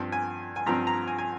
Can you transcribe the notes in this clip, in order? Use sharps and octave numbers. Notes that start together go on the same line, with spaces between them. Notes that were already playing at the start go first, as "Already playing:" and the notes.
Already playing: G2 F3 C4
G#5
G#5
G2 F3 C4 A#5
A#5
G#5
G#5